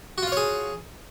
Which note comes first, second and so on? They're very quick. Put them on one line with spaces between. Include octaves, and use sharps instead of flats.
F#4 F4 F5 C#5 G#4